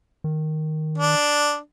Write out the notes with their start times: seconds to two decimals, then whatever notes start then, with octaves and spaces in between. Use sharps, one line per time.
0.24 D#3
0.98 D4